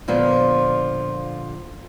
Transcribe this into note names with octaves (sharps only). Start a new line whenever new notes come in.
A#2 D3 F3 A#3 B3